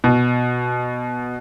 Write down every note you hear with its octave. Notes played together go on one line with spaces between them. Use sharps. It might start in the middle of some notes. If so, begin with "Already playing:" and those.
B2